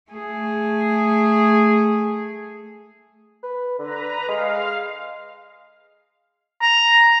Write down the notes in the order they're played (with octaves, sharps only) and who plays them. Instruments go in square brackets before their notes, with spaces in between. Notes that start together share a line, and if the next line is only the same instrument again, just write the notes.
[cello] A3 G#4
[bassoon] B4
[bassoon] D3 [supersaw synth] B4 A#5
[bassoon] G#3 [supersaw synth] F5
[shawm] A#5